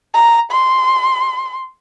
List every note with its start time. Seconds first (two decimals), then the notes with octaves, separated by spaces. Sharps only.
0.14 A#5
0.51 C6